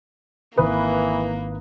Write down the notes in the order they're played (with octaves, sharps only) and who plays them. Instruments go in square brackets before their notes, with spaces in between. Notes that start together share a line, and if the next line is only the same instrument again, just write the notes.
[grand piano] G#1 E4 D#6 [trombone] E3 [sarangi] A#3 [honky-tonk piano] B4